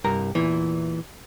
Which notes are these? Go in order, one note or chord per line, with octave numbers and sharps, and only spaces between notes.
C2 G2 A#4 A#5
E2 A#2 E3